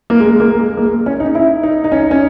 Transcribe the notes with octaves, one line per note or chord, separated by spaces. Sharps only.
A#3
G#3
G#3
A#3
G#3
A#3
C#4
D#4
E4
D#4
D#4
C#4
C#4